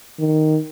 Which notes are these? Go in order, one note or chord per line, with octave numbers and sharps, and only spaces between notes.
D#3